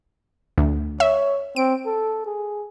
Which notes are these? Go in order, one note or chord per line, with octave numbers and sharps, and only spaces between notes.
D2
C#5 E5
C4 D7
A4
G#4